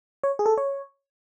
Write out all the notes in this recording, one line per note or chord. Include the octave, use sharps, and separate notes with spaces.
C#5
G#4
A4
C#5